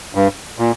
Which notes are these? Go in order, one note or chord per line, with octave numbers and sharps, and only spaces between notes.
G2
A#2